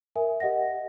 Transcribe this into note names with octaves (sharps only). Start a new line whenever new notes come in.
A#4 E5 G#5
G4 D#5 F#5 A#6